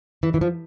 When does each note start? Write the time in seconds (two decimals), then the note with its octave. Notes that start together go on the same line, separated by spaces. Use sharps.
0.23 E3
0.34 E3
0.41 F3